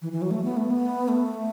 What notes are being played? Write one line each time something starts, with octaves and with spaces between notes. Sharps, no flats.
E3
E3
F#3
A3
B3
A3
B3
A3